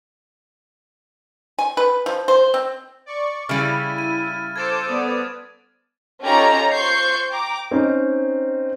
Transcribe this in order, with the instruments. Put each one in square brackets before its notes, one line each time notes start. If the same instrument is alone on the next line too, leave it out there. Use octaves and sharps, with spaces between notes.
[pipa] G#5
B4
F3
C5
C4
[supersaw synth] D5 C#6
[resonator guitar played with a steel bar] C#3 G3 [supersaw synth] E4 [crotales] F6 A6 D#7
[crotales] D#7
[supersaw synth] A4 C5 D6 [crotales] G#6 A6 E7
[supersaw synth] B3 D5 [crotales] D#6
[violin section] C#4 D#4 F4 G4 A4 A#5
F4 C5 C#6 G6 C7
G5 A#5 D6
[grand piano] C4 C#4 D#4